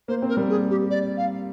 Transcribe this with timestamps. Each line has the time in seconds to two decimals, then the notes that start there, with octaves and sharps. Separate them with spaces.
0.08 A#3 C5
0.22 C4
0.29 A#4
0.36 G3 A#3
0.49 G#4
0.70 G4
0.90 D5
1.17 F5